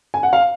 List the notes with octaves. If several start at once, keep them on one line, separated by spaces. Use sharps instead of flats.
G#5
F#5
F5